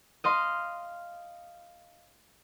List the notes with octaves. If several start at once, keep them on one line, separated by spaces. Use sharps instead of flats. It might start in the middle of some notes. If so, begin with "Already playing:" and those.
D#5 F5 C6